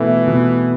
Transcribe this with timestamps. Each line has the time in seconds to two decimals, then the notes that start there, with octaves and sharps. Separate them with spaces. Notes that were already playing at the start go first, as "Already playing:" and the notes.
Already playing: B2 E3 A3
0.27 B2